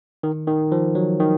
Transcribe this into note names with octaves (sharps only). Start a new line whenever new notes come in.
D#3
D#3
F3
F#3
D#3